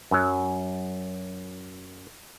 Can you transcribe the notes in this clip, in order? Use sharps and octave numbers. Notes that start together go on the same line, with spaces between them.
F#2 F#3